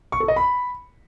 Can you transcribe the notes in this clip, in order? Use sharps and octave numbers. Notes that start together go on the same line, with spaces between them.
C#6
A4
D#5
B5